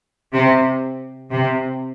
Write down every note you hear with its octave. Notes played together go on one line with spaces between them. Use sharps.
C3
C3